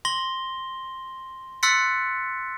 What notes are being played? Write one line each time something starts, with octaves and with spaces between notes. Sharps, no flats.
C6 A#6 G7
C6 E6 F#6 A6 B6 C#7